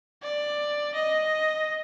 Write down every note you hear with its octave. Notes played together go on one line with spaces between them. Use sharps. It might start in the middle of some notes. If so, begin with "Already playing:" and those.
D5
D#5